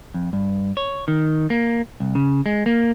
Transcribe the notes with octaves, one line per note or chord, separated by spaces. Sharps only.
F2
G2
C#5
D#3
A#3
C2
C#3
G#3
A#3